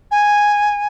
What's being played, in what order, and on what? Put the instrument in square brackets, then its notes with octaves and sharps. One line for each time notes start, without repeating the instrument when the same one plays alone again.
[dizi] G#5